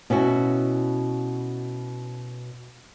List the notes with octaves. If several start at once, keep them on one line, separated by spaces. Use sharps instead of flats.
B2 C#4 E4 F#4